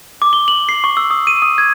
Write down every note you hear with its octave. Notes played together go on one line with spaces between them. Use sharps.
D6
G7
F#7
C7
C#6
E6
D#6
D#7
D#6
G#6